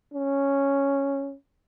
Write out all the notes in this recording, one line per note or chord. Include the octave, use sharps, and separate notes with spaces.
C#4